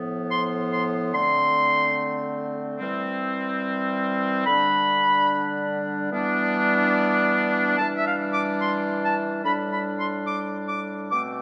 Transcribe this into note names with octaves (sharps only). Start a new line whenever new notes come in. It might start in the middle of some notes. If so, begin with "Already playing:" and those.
Already playing: A2 F3 B3
C6
C6
D3 A3 C4 C6
E3 G3 C4
D3 G3 D4 B5
E3 G3 B3 D4
E3 G3 D4 A5
E5
F5
D6
C6
A5
A2 G3 D4 B5
B5
C6
D6
D6
B2 A3 C4 D6